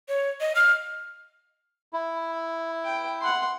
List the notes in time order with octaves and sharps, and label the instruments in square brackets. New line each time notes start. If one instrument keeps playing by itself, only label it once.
[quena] C#5
D#5
F6
[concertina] E4
[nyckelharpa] G5
F#5 C6